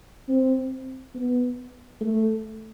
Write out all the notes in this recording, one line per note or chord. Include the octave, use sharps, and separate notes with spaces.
C4
B3
A3